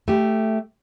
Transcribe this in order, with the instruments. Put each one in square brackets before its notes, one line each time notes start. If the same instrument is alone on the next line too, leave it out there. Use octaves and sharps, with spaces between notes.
[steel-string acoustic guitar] A3 G4